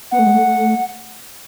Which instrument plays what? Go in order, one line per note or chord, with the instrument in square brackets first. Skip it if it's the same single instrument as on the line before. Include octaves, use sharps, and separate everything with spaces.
[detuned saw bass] B3 [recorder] F#5
[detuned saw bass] A3
G#3
A3